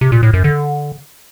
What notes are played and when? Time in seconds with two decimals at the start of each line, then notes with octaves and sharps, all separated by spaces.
0.01 C3
0.12 A#2
0.23 A2
0.33 F#2
0.44 D3